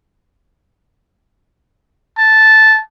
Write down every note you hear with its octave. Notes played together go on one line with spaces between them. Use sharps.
A5